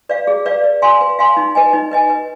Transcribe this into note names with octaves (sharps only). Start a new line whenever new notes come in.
B4 D5 F5
G#4
B4 D5 F5
B4
F5 G#5 C6
B4
F5 G#5 C6
D#4
B4 D#5 G#5
D#4
B4 D#5 G#5
B4